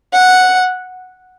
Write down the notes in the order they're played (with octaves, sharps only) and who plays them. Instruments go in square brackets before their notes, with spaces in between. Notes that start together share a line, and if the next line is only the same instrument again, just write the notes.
[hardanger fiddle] F#5